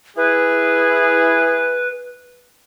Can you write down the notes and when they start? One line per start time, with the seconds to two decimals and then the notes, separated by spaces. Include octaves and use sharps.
0.17 E4 G#4 B4